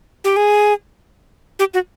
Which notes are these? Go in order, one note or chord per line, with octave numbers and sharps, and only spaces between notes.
G4
G#4
G4
F#4